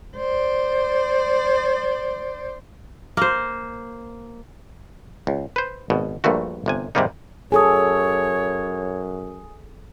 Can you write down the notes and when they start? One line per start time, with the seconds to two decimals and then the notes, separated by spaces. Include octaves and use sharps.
0.17 C5 D5
3.17 A#3 C5
5.27 C#2
5.56 B4 C5
5.90 G#1 B2
6.24 A#1 G2 A#2 A3 F#4
6.66 G1 C3 G#5
6.95 G#2 C3 D#3 G3 A#3 D#4
7.52 F#2 G#4 A4 C#5 G#5 D#6